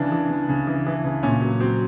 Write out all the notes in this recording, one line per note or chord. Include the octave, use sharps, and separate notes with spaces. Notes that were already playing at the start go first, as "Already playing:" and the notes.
Already playing: C#3 E3 D4
E3
C#3
C#3
E3
E3
C#3
A#2 C#4
F#3
F#3 C4